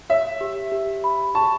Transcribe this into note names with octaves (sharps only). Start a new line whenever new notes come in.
C#5 E5
G4
G4
B5
A5 C#6